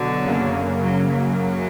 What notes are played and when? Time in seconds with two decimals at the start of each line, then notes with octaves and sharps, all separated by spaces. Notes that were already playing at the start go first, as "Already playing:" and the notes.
Already playing: B2 D3 F#3
0.24 F#2 C#3 F#3 A#3
0.82 F#3
1.11 F#3
1.39 F#2